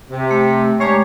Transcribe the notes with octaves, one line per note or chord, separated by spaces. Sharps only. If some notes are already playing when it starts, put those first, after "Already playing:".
C3
A3
G#3 D4 G4 C#5 A#5 D6